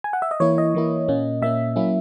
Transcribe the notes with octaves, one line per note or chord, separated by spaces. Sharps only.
G#5
F#5
E5
D#5
E3 A#3 E4 C#5
D#5
E3 A#3 E4
A#2 A#3 C#4
A#2 A#3 C#4 E5
F#3 A#3 C#4 E4